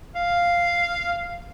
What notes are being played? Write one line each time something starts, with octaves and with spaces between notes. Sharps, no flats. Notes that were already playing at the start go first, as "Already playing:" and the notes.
F5